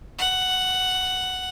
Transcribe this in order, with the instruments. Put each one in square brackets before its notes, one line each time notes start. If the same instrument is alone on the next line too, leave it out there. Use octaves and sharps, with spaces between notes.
[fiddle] F#5